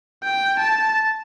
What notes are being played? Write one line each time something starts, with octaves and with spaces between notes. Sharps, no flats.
G5
A5